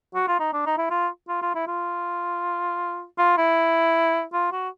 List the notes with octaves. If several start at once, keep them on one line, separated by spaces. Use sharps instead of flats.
F#4
F4
D#4
D4
D#4
E4
F4
F4
F4
E4
F4
F4
E4
F4
F#4